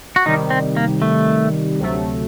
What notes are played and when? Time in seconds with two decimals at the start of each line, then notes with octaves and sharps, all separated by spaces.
0.16 F#4
0.25 C3 D#3 G3 D#4
0.50 C4
0.77 A#3
1.02 A3
1.79 D2 C3 F#3 A3